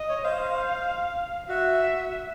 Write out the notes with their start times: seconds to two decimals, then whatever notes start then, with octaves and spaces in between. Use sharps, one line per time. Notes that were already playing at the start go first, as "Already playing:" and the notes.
Already playing: D#5
0.09 C#5
0.24 C5 F5
1.49 F#4 E5